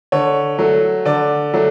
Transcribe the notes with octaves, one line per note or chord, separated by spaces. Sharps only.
D3 C#5
F#3 A3
D3 D5
F#3 A3